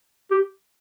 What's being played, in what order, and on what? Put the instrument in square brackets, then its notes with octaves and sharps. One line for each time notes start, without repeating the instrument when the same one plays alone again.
[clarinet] G4